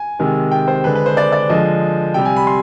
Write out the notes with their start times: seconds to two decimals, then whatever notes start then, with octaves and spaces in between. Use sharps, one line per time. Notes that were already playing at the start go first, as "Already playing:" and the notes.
Already playing: G#5
0.19 C3 D#3 G#3
0.51 G5
0.68 C5
0.84 D3 G#3 B4
0.95 B4
1.06 C5
1.17 D5
1.32 D5
1.49 D3 F3 G#3 D#5
2.14 C3 G3 G5
2.25 G#5
2.36 B5
2.47 C6